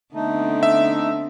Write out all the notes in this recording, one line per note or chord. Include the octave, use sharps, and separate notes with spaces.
D3 A3 B3 C4 D#4
E5